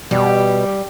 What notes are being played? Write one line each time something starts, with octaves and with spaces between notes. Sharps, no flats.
B2 G3 G4